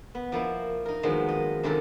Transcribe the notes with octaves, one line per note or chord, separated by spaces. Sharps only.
B3
F3 A#3 E4
D#4 A#4
D#3 F3 F#3 G#3 B3 C4
D#5
F#2 C3 D#3 D#4 A4